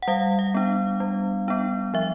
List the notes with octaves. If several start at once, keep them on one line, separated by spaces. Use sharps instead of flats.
F#5
G3 F5
F5
B3 D4
G3
B3 D4
F3 E5